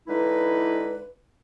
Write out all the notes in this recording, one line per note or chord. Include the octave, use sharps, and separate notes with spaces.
D3 E3 G#3 D#4 E4 B4